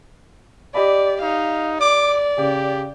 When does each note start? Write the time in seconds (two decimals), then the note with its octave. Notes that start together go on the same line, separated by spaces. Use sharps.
0.74 G4 D5 D#5 B5
1.22 D#4 F5
1.80 D5 D6
2.38 C#3 G4